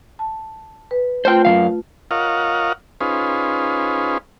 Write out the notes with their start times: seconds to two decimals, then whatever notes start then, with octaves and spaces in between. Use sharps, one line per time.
0.19 A5
0.91 B4
1.25 A3 F4 C5 G5
1.45 F#2 E3 F5
2.11 F4 A#4 C#5 D#5 F5 F#5
3.01 C#4 D#4 F4 G#4 B4 C5